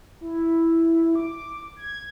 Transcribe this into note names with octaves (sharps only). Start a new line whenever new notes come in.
E4
D6
G#6